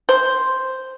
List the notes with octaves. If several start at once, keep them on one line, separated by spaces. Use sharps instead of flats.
C5